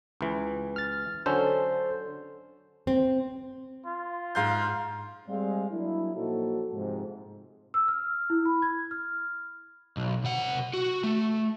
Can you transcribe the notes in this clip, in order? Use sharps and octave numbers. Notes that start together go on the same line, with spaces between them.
C#2 E3
F6 A6
D3 F#3 C#4 A4 C5
C4
F4
G#2 F5 G6
G3 G#3 C4 G#4 D5 F5
F#3 A#3 D4 E4
A#2 F3 F#3 D#4 F#4 A4
G#2 C3 F3
E6
F6
E4
B5
G#6
F6
B1
C3 F#5
F#4
A3